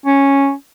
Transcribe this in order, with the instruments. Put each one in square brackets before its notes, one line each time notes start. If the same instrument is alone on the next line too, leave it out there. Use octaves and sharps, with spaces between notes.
[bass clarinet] C#4